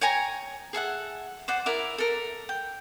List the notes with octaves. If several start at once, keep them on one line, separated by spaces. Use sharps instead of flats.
C#5 G5 G#5 A#5
G#4 A4 E5 F#5
C5 D5 F#5
E4 A#4 D5 E5
A4 A#4
G5